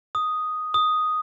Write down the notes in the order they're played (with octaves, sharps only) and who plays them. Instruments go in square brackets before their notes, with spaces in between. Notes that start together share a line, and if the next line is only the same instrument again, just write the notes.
[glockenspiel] D#6
D#6